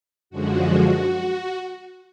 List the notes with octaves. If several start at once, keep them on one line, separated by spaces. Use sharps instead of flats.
F#2 D3 F3 G#3 F#4